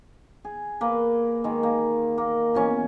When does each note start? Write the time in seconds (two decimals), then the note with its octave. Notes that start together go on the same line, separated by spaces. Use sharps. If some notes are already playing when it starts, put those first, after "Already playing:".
0.45 G#4
0.81 A#3 B4
1.44 D#3 G#3
1.63 A#3
2.18 A#3
2.54 B2 E3 C#4 C#5